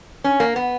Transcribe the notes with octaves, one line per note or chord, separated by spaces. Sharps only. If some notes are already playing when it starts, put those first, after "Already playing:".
C#4
A#3
B3